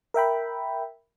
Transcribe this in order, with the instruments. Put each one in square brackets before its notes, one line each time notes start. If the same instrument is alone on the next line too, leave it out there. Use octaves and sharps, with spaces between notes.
[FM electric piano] A#4 E5 G5 B5